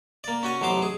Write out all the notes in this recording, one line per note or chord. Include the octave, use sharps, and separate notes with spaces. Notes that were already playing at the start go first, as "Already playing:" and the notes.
A#3 D5
C#4 F#4 G#5
A1 B2 F#3 C5 D6
G#4